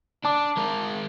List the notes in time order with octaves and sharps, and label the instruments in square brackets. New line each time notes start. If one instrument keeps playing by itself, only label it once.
[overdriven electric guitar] D4 [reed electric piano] A5 D6
[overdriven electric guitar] G#3 A#4